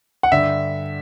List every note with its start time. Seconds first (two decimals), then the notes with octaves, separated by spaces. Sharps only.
0.23 F#5
0.32 G2 D3 E5